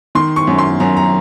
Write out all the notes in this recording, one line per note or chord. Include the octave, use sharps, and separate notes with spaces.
D#3 C6
C#6
F#2
C6
F#2 A#5
A#5